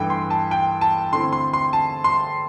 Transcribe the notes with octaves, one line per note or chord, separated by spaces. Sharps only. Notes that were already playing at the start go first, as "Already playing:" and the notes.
Already playing: G2 E3 A3 E4 G5
C6
A5
G5
A5
D3 A3 C4 E4 C6
C6
C6
A5
C6